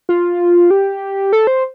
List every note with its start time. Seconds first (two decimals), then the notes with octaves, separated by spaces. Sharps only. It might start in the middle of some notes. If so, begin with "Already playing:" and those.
0.09 F4
0.71 G4
1.33 A4
1.47 C5